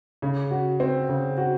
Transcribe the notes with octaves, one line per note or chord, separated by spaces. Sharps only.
C#3
F#4
C4
C#3
F#4